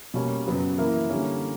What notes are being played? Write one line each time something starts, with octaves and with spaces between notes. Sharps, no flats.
B2 G3 A#3 C#4
F#2 C#3 F#3 B3 F#4
E3 A#3 E4 A#4
D3 G3 A#3 C#4